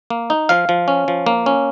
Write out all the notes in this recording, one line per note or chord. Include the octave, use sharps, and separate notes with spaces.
A#3
D#4
F3 F5
F3
C#4
F3
A#3
C#4